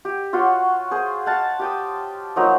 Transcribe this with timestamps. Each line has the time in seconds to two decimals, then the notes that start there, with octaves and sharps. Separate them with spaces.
0.05 G4
0.33 F4 F#4 C#5 C6
0.91 G#4 C5
1.26 F5 F#5 A5
1.59 G4 G5 D#6
2.36 F3 F#3 A#3 D#4